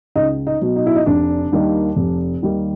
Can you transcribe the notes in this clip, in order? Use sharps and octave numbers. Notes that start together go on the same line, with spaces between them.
C#2 D#4
D#4
B2 F#3
D#4
E4
D#4
F1 D4
D#2 D#3 G3 A#3
F1
D#2 D#3 G3 A#3